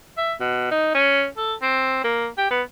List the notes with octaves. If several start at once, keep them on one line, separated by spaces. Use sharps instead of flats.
E5
B2
D#4
C#4
A4
C4
A#3
G4
B3